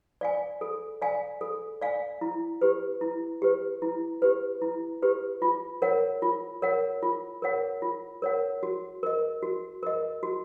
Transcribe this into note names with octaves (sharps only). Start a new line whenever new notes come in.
D5 F5 G#5
A4
D5 F5 G#5
A4
D5 F5 G#5
E4
G4 B4
E4
G4 B4
E4
G4 B4
E4
G4 B4
F4
A#4 C#5 F#5
F4
A#4 C#5 F#5
F4
A#4 C#5 F#5
F4
A#4 C#5 F#5
F#4
A#4 D#5
F#4
A#4 D#5
F#4